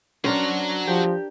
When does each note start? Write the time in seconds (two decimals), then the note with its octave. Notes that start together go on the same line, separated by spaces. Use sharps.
0.24 F#3 C#4 D4 A#4 C5 A#5
0.87 F3 G4